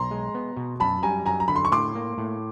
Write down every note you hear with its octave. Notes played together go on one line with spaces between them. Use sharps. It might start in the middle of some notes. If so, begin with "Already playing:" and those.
Already playing: B1 A#5 C6
G#3
B3
B2
F#2 A5 B5
G3 G#5 A#5
F#2 G#5 A#5
A#5
D3 B5
C6
C#6
A2 C6 D6
A#3
A2